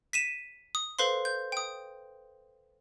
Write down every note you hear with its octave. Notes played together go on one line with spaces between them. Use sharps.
B6 D#7 E7
D#6
A4 B4 C5 F5 C6
G6
G5 D#6